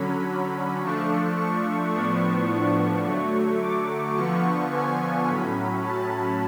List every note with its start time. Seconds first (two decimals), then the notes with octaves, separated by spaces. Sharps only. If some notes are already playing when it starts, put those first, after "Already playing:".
Already playing: D3 F#3 C#4 B5
0.83 F3 A3 D4 C#6
1.38 C#6
1.94 A2 F3 B3 D4 C#6
2.50 C#6
3.06 D3 F#3 A3
3.61 D6
4.16 D3 F3 B3 C#6
4.73 G#5
5.27 A2 F#3 C#4 B5
5.84 A5